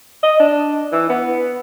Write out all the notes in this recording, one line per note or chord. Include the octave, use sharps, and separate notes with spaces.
D#5
D4
E3
B3